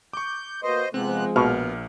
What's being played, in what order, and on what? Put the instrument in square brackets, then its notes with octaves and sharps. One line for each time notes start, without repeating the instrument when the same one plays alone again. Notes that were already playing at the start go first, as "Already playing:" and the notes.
[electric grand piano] C#6 D6 [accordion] G6
[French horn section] A#3 F#4 B4 [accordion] C5 D#5
[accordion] C3 B3 F#6 [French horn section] F3 G#3 [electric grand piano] C4
[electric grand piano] A#1 A#3 F6 [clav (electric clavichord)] B2 [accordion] B3